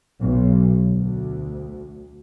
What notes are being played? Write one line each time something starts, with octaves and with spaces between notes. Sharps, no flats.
B1
D2